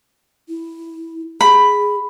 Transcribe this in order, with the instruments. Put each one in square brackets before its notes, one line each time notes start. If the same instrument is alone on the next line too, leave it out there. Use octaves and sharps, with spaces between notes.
[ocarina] E4
[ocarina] G#4 [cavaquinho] B5